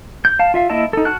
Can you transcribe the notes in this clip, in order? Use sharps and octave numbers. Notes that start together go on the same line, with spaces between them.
G6
F5 A5
F4 E5 F5
A#3 E4 D#5 E5 A5
D#4 A4
F#4 A5 F6 F#6